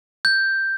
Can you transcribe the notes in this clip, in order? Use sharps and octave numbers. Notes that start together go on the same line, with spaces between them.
G6